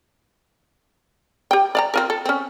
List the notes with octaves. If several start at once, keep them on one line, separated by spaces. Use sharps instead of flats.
G4 G5
D5 F5 A#5
C4 F4 A#4
A4
C4 C#4